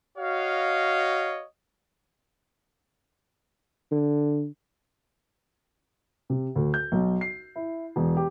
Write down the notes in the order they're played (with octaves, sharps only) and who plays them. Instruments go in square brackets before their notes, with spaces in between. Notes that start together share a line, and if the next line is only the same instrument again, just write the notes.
[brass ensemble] F#4 C#5 D#5 F5
[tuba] D3
[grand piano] C3
D2
G6
B1
C7
E4
E1
G4